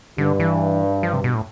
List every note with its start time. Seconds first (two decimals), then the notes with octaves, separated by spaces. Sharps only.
0.18 G2 D3
0.40 E3
1.03 F3
1.13 C3
1.24 B2
1.34 A2